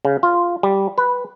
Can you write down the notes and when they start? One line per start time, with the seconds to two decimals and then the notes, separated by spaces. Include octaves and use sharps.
0.05 C#3
0.23 F4
0.63 G3
0.98 B4